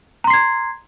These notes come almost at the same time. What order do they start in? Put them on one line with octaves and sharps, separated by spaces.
A#5 C6 C7 G#6